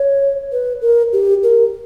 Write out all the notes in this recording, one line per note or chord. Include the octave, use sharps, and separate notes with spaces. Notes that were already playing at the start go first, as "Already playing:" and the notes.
Already playing: C#5
B4
A#4
G4
A#4